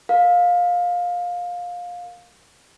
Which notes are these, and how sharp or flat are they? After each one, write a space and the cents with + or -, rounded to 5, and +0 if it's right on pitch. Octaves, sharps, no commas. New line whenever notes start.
A#4 +0 F5 +20